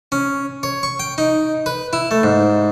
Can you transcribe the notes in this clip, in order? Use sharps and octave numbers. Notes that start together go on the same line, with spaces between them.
C#4
C#5
C#6
G5
D#4
B4
E4
A3
G#2